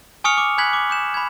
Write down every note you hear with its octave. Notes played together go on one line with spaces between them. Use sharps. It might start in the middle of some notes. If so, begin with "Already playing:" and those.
G#5 C#6 D#6 F6 C#7 F7
D6
G#5 B5 F#6 G#6 B6 F#7
D6
D6 G6 E7
B5 G#6